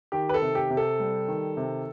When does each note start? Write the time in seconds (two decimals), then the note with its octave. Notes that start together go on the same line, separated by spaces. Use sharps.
0.12 D#3 G4
0.29 B4
0.34 A4
0.42 C3
0.55 G4
0.70 C3
0.77 A4
1.00 G3
1.28 D#3
1.57 C3